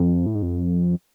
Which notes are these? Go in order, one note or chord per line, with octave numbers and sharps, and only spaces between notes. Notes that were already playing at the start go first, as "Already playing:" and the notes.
Already playing: F2
A2
G#2
F2